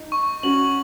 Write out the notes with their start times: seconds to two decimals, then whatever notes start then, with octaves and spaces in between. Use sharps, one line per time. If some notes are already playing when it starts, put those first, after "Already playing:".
Already playing: D#4
0.12 C#6
0.43 C#4 F#4 F#7